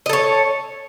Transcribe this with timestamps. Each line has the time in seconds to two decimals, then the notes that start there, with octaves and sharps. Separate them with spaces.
0.06 D#5
0.09 A4
0.13 C#5